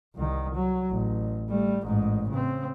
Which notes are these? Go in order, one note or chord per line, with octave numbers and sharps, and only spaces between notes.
C2 D#3
F#3
A1
G3 A3
A1 G#2
C#3 C4